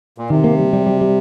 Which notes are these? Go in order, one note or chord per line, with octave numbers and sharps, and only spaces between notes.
A#2
C3 D#3
A#3
G3
G3
G3
G3